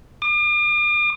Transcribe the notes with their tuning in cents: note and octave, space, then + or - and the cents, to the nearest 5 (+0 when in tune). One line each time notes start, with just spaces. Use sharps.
D6 +45